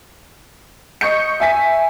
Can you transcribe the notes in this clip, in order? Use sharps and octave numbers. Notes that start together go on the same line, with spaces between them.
D#5 C#6 G6 C#7
E5 G#5 B6